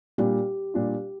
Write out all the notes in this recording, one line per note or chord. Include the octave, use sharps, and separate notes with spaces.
A#2 G3 D4 F4 G4
A#2 G3 D4 F4